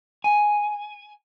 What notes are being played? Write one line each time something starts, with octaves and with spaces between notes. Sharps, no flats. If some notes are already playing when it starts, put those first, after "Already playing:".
G#5